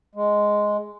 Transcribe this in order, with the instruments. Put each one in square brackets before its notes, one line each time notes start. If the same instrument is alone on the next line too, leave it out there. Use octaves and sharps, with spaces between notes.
[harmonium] G#3